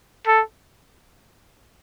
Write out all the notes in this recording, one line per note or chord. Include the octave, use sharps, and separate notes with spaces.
A4